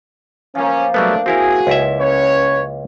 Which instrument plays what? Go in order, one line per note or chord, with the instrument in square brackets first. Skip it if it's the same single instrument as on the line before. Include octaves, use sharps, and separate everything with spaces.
[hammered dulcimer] F3 A#3 [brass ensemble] C#4
[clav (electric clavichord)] F#3 G3 B3 [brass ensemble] A3 D4
[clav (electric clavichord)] C4 E4 A#4 [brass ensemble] F#4 G#4
[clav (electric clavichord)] C#2 E4 E5
[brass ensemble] C#4 B4 C#5